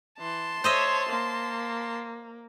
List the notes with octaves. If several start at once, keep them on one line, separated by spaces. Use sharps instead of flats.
E3 A5 C6
C5 C#5 D#5 E5
A#3